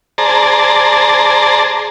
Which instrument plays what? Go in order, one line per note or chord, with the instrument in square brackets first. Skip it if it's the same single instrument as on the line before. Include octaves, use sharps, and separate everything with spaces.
[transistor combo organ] G#4 C5 D5 A5 A#5